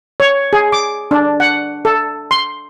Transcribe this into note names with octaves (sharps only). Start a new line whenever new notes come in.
C#5
G#4
D6
D4
F#5
A4
C6